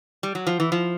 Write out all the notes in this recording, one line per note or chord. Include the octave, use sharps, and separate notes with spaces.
G3
F#3
F3
E3
F3